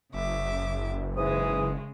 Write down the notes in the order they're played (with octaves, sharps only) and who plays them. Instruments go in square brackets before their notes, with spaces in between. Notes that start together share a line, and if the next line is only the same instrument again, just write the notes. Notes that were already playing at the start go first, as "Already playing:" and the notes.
[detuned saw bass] F#1 [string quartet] C#3 E5 D6
[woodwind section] G#2 E3 D#6 [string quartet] C#3 G#3